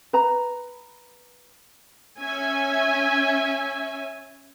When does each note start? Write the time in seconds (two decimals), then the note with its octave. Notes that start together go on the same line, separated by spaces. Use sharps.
0.13 B4 A#5
2.19 C#4 E5 G#5